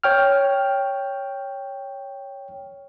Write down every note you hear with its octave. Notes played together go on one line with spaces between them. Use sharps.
C#5 G5 F6